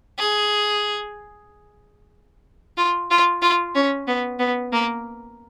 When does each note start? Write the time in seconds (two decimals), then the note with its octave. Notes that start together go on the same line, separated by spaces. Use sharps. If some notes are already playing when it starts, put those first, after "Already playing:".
0.18 G#4
2.77 F4
3.11 F4
3.42 F4
3.75 C#4
4.07 B3
4.39 B3
4.73 A#3